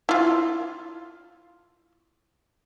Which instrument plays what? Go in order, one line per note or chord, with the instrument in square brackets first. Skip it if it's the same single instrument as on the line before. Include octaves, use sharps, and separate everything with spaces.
[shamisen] E4 F4